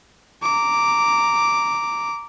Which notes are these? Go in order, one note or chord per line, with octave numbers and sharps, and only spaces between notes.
A#5 D6